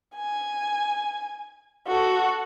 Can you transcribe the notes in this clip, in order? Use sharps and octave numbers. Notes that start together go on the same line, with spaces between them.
G#5
F#4 A4